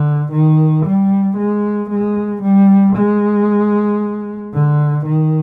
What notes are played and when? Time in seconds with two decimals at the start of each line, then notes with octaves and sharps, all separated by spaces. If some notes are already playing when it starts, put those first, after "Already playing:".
Already playing: D3
0.32 D#3
0.85 G3
1.38 G#3
1.90 G#3
2.42 G3
2.96 G#3
4.54 D3
5.06 D#3